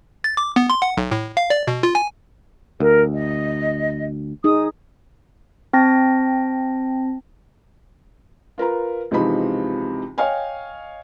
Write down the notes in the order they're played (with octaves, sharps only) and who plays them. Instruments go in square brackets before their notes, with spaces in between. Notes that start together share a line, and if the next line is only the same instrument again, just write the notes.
[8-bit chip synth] A6
D6
B3
C6
F#5
B1
A2
F5
D5
B2
F4
G#5
[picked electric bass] D2 [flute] A#4
[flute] D#5
[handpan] D#4 G#4 [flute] D#6
[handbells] C4 G5 A5 A#6
[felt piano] F4 A#4 B4 A#5
C#2 C3 E3 F3 D#4 B5
C#5 D#5 F5 G5 G#5